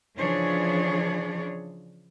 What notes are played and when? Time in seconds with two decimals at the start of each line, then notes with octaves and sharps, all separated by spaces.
0.17 C#3 E3 F3 D4 G#4 C#5